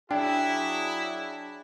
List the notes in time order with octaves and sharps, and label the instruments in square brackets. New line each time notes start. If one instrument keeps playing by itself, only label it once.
[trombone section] F#3 G#4 [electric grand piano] D4 [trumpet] E4 [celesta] G5